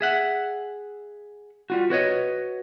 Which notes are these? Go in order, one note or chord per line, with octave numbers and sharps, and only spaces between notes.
G#4 E5 F#5
G3 F4 F#4
F#4 B4 C#5 D#5